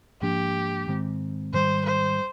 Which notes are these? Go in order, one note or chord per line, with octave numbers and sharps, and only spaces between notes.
G#2 F3 A#3 D4 G4
G#2 D#3 G#3 C4
G#2 D#3 G3 C5
C5